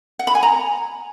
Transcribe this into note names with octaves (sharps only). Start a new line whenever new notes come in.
F#5
B5
G#5
A#5